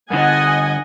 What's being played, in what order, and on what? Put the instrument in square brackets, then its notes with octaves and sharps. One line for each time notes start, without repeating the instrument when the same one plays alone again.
[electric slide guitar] G2 D3 [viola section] D#5 F#5 G#5